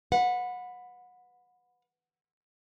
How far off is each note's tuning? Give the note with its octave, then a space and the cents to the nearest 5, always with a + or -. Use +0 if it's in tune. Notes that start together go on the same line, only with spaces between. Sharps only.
B4 +10 F#5 -25